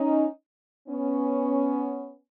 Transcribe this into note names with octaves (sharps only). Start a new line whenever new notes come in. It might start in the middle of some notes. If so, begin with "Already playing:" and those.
Already playing: C#4 D#4
B3 C#4